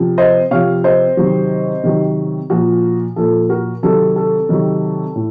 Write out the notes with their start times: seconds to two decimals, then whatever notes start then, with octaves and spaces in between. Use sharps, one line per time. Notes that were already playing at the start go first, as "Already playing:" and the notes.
Already playing: C3 F3
0.18 C5 D#5
0.51 C3 F3 C#5 F5
0.84 C5 D#5
1.17 C3 D#3 F#3
1.83 C3 D#3 F#3
2.50 A#2 F3 F#4
3.16 A#2 F3 A4
3.49 F#4 A#4
3.83 C3 D#3 F#3 A4
4.16 A4
4.49 C3 D#3 F#3
5.16 A2